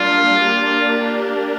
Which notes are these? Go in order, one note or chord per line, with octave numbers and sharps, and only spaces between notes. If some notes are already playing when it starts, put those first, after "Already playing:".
Already playing: G3 A#3 D4 F4
A#3 D4 G4 A#4